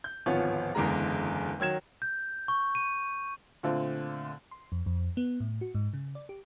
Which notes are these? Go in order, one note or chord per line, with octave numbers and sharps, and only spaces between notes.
G6
D1 G#1 F3 B3 F4 C#5
F#1 E2 D3 G#3 A#5
D#3 F#3 G#6 E7
G6
C#6
D#7
A#2 D3 A3 C4 F4
C6
F2
F2
B3
A2
F#4
G#2
C#3
D5
G4